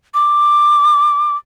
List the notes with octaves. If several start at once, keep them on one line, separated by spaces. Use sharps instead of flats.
D6